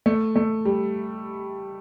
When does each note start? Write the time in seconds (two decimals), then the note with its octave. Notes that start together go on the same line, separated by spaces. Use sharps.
0.06 A3
0.36 A3
0.65 G3